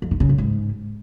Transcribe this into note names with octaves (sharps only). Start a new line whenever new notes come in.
F2
D#3
C#3
F#2
G#2